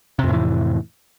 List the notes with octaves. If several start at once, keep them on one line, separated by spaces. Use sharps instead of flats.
F2 A2 C3 E3